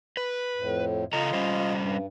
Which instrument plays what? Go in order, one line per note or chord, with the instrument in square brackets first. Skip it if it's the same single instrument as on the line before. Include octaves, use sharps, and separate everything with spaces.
[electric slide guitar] B4
[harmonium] F2 A2
[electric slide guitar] C#3 A4 A#5 [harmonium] F4 D#5
[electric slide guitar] G3 C#4 C5
[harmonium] G2